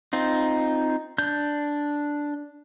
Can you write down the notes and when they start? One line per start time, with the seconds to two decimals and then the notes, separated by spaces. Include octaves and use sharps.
0.13 C4 D#4 F4
1.18 D4 G6